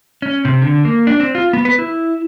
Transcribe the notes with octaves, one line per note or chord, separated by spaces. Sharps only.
C#4
C3
D3
A#3
D4
C4
F4
B3
B4
E4